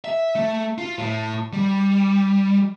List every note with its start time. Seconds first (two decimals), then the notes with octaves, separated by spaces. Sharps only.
0.05 E5
0.35 A3
0.78 F4
0.98 A2
1.53 G3